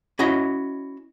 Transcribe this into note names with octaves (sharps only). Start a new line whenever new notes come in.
C#4 E4 F#4 C#5 D#5